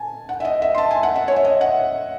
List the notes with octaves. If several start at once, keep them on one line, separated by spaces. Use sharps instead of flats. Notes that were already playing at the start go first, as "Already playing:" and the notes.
Already playing: G#5 A5
F#5
E5
D#5
E5
C6
A5
G#5
F#5
E5
C#5
E5
D#5
F#5